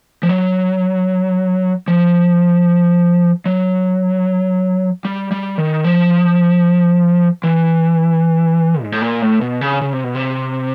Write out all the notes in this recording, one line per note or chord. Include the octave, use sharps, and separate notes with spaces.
F3
F#3
F3
F#3
G3
G3
D#3
F3
E3
G#2
A2
A#2
A2
B2
C#3
C#3
C3
B2
C3